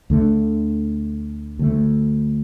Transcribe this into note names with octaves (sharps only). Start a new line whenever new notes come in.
D2 D3 A3
D2 D3 A3